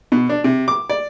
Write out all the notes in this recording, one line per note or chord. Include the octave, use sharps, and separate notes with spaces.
B2
D4
C3
D6
D5